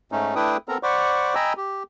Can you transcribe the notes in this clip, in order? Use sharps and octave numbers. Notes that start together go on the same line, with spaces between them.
G#2 A3 C#4 D#4
A3 D4 E4 B4 G5 D#6
B3 C4 A4 A#4 A#5
C5 D5 F#5 B5 C#6 D6
D#5 G5 G#5 A#5 B5 E6
G4